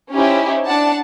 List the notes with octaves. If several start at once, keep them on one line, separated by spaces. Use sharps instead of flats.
C#4 D#4 E4 G4 C5
D4 D5 F#5 A5